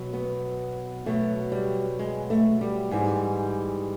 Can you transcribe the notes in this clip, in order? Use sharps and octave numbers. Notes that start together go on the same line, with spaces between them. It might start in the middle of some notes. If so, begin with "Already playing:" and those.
Already playing: B2 F#3
B3
B2 F#3 A3
G3
G#3
A3
G3
G#2 E3 G3